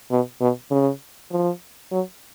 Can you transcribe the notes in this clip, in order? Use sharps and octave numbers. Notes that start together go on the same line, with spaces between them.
B2
B2
C#3
F3
F#3